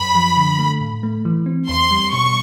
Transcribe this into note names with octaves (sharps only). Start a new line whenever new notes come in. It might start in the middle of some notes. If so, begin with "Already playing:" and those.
Already playing: F#2 B5
F3
D3
A3
A2
A3
E3
C4
E2 C6
G3
B2 C#6